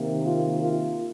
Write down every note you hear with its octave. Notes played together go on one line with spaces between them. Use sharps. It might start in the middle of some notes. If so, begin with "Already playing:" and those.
Already playing: C3 D#3 A#3
F4
F4